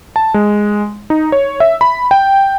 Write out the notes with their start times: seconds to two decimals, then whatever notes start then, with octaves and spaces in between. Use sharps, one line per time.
0.16 A5
0.34 G#3
1.10 D#4
1.32 C#5
1.60 E5
1.81 B5
2.11 G5